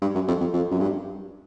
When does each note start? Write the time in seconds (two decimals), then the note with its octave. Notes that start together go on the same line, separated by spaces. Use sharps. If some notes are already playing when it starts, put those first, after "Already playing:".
0.01 G2
0.15 F#2
0.28 F2
0.41 F2
0.54 F2
0.71 F#2
0.80 G2